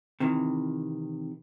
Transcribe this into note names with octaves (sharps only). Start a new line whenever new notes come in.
C3 D#3 E3